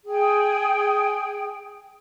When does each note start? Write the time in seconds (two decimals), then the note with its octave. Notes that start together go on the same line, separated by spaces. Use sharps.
0.05 G#4 G5